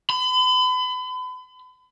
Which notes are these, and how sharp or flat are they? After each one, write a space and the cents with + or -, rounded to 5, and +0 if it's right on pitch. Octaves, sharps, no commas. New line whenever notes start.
B5 +40